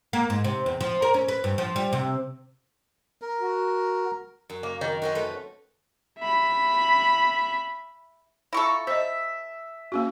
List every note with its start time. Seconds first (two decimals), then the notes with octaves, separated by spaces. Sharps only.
0.13 A#3
0.30 G#2
0.44 C3
0.66 E2
0.81 F3
1.02 A#4
1.14 C#4
1.28 B4
1.44 G2
1.58 F3
1.76 G3
1.93 C3
3.22 A#4
3.41 F#4
4.50 F#2
4.63 A#3
4.81 D#3
5.02 C4 C#4 F#4
5.15 A3 B4
6.19 E5 B5
8.53 E4 F4 A4 A#5 C#6
8.87 C5 D#5 E5
9.92 A#3 C#4 F#4